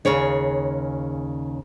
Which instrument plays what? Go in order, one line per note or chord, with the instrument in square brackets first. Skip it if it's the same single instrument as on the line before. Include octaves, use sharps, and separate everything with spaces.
[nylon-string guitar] D#2 C#3 G#4 C#5 D5